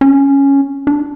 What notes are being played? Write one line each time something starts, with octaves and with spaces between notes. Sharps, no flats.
C#4
D4